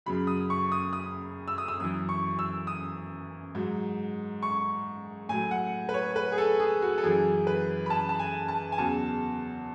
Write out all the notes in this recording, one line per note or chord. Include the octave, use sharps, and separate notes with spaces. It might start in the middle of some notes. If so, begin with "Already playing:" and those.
F#2 C#3 F#3 B5
D#6
C#6
D#6
D#6
E6
D#6
E6
F#2 E3 D#6
C#6
E6
D#6
G#2 F#3
C#6
A2 F#3 G#5
F#5
B4
C#5
B4
G#4
A4
G#4
F#4
A4
F#2 E3 G#4
B4
B5
A5
A5
G#5
A5
G#5
E2 C#3 F#3 A5